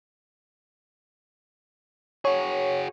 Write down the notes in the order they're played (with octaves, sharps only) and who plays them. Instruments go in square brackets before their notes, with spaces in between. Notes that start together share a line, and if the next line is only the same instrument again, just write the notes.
[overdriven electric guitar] F#4 G#4 [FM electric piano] C#5